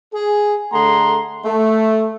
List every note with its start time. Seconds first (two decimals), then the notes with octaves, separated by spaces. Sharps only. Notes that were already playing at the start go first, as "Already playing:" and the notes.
0.13 G#4
0.73 D3 A3 G#4 F#5 A#5 C6
1.45 A3